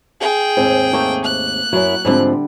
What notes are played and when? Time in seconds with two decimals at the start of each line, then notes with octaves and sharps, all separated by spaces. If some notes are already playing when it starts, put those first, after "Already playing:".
0.20 G#4 G5
0.57 D#2 G#2 C4
0.93 A3 A#3 D#4
1.25 F#6
1.73 F#2 F#3 E4
2.05 G#2 D3 F3 G3 C4 E5